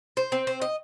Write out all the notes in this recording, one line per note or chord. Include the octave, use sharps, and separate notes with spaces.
C5
C4
C5
D#5